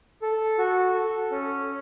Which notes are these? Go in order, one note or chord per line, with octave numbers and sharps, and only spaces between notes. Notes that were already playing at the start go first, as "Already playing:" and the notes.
A4
F#4
A4
C#4